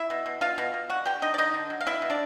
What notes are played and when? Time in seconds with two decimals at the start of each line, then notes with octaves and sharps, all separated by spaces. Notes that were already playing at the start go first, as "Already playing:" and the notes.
Already playing: E4 E5
0.10 B2
0.26 B2
0.41 B2 F4 F5
0.58 B2
0.74 B2
0.90 D3 F#4 F#5
1.06 D3 G4 G5
1.22 D3 D#4 D#5
1.34 D5
1.38 D3 D#4 D#5
1.54 D3
1.70 F#3
1.81 F5
1.86 B2 E4 E5
2.02 B2
2.10 D4 D5